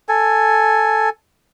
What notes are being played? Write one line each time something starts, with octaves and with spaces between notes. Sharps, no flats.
A4 G#5